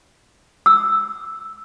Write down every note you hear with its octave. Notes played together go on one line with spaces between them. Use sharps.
E6